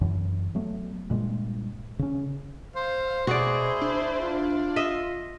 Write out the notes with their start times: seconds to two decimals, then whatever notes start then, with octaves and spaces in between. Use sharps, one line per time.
0.01 F#2 E3
0.55 F#3 A3 B3
1.10 G2 A#2 G#3
1.99 C#3 C#4
2.75 C5 F5
3.27 B2 E4 F#4 G#4 C5 D5
3.81 D4
4.21 F4
4.76 D#5 E5